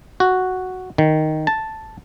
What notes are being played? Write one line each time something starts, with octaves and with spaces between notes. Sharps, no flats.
F#4
D#3
A5